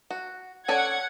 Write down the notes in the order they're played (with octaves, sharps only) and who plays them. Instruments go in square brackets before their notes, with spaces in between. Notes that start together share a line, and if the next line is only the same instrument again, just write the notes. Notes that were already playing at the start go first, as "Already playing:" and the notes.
[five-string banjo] F#4
[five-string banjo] C#4 A4 D5 [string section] F#5 G#6